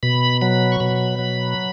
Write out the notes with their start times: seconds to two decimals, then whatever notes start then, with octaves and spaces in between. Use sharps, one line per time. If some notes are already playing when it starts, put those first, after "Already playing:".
0.03 B2 B5
0.41 F#3 B5
0.72 C#6
0.80 B2 B5
1.19 F#3